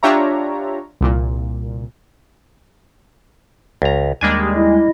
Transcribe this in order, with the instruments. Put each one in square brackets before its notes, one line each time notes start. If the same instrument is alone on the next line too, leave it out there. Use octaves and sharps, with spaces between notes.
[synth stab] D4 F4 G4 C#5 E5 A#5
C2 A#2
[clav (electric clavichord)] C#2 A#5
[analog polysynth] D#2 G3 G#3 [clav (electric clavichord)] A#3 D4 G#5
[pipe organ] E4 D#5